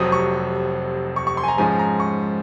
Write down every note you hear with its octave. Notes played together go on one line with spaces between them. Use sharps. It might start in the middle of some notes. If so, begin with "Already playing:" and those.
Already playing: F1 F2 C3 F#3 C4 D#6
C#6
C#6
C#6
C6
G#5
A#5
G#2 F3 G#3 C#4 G#5
A#5
C#6